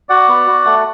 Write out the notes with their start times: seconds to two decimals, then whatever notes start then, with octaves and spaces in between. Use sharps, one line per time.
0.09 F#4 D5 F#5
0.28 B3
0.47 F#4
0.65 A3